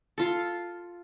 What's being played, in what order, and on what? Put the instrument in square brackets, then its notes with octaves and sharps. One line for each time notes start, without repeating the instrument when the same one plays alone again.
[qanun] F4 A4